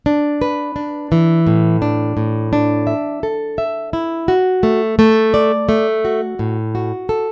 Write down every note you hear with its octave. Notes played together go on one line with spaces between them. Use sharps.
D4
B4
D4
E3
A2
D4
A2
D4
E5
A4
E5
E4
F#4
A3
A3
D5
A3
F#4
A2
F#4
A4